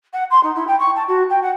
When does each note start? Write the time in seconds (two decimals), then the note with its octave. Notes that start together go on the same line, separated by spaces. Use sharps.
0.13 F#5
0.31 C6
0.43 D#4
0.55 E4
0.67 G5
0.79 C#6
0.96 A5
1.08 F#4
1.30 G5
1.42 F#5